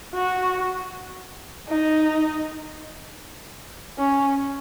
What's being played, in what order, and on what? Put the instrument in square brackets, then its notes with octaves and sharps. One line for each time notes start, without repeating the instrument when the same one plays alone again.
[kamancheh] F#4
D#4
C#4